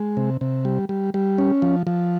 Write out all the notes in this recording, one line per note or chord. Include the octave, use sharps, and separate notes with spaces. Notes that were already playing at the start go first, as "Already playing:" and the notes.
Already playing: G#3
C3
C3
G3
G3
G3
C#4
F3
F3